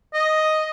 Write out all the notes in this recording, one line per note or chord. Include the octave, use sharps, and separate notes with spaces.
D#5